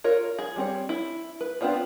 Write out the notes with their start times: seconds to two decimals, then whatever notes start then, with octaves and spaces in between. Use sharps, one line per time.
0.04 F4 A#4 C#5
0.39 G#4
0.56 G3 C4 C#5
0.89 E4
1.41 B4
1.61 B3 C4 D4 F4 C#5